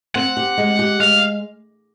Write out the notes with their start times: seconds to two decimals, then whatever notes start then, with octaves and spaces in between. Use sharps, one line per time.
0.15 C4 F#5
0.37 G4
0.58 G#3
0.79 G4
1.00 G#3 F5